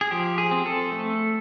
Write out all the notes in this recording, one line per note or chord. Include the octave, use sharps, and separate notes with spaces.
G#4
F3 G4
G#4
C4
A4
A3